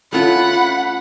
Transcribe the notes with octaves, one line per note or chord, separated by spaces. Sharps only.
A3 C#4 F4 F#5 B5